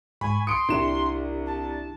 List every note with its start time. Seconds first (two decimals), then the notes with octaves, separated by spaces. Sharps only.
0.21 G#2 G#5 B5 C#6
0.47 C6 D#6 C#7 D7
0.69 C2 D4 E4 G4 E7
1.46 A5